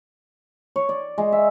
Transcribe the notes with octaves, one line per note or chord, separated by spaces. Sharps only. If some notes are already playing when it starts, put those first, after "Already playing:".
C#5
D5
G#3
E5